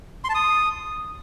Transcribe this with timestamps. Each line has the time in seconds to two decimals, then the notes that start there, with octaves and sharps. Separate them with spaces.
0.24 C6
0.29 A5
0.35 D#6